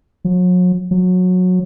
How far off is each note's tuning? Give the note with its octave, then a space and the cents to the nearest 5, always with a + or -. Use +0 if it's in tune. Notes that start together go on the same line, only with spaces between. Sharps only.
F#3 -40
F#3 -20